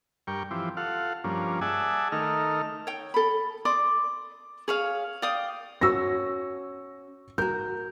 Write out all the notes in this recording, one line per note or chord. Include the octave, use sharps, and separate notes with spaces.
G2 A#4 G5 C#6
E3 F3 C4 G4
F4 A4 F5 F#5
G2 F3 A#3 C#4
G#4 D5 E5 F#5 G#5 A5
D#3 A3 D#4 A4 A#4 F6
C#5 G5
A4 B5
D5 C6 D6 D#6
G#4 C#5 F5
D5 F5 G5 D#6
C#4 F#4 C#6 E6 A#6
F#4 A#4 G6